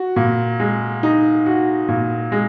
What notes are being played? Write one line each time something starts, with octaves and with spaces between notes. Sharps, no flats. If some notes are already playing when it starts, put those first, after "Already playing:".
Already playing: F#4
A#2
G#3
D#4
F#4
A#2
G#3